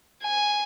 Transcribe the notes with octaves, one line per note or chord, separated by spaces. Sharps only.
G#5